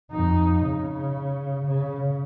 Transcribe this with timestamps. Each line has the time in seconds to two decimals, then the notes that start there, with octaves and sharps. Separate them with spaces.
0.12 F2 D#4
0.65 C#3
1.66 C#3